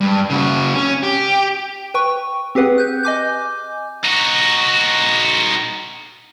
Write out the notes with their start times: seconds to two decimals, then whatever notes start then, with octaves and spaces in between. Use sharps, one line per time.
0.01 G2
0.30 C#3 F#4
0.75 C#4
1.03 G4
1.94 B4 G5 C#6
2.55 C4 G4 G#4 B4 F#5
2.78 F#6 G6
3.03 D#5 G#5 D6 G6
4.05 D#4 F#4